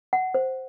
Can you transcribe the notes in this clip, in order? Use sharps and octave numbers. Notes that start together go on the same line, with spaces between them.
F#5
C5